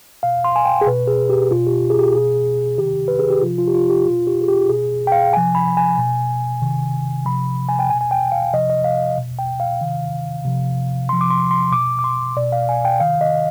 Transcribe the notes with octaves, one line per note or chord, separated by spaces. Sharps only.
B2 F5
C6
G#5
G5
G#4
B2 B4
G#4
G4
B2 F4
G4
G#4
G4
B2 G#4
C3 D#3 G4
B4
G#4
G4
C3 F3 F4
F4
G4
F4
G4
B2 F4
G4
G#4
G4
B2 G#4
G5
F5
C3 F3 G#5
B5
G#5
B2
C3 D#3
C3 F3 B5
G#5
G5
B2 G#5
G#5
G5
F5
C3 F3 D#5
D#5
F5
B2
G5
F5
C3 D#3
C3 F3
C3 F3 C6
D6
C6
C6
B2 D6
D6
C6
B2 D5
F5
G#5
G5
C3 D#3 F5
D#5